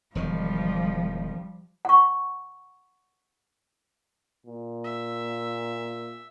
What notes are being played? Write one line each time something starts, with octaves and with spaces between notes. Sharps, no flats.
E1 D#3 F3 G3
F#5 C#6
A#2
E5